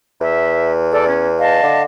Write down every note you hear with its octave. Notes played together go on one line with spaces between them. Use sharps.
E2 E5
A4 D5
C#4
D#5 F5 A5
D3